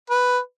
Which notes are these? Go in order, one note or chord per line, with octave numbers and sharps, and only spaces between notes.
B4